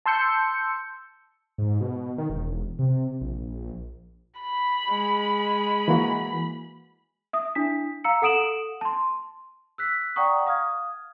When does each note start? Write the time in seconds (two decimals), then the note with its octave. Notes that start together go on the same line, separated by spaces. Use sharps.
0.06 A5 C6 E6 G6 C#7
1.58 G#2
1.81 B2
2.18 D#3
2.30 E1
2.79 C3
3.21 A#1
4.41 B5
4.90 G#3
5.88 E3 A#3 F#4
7.33 E5 D#6
7.55 D4 E4 B6
8.04 F5 A#5 E6 C#7
8.22 A4 F#5 D#6 D7 E7 F#7
8.81 A5 C6
9.78 E6 F#6 B6 C7
10.16 D5 F#5 G5 A#5 C#6 D#6
10.47 F5 D#6 F6 G#6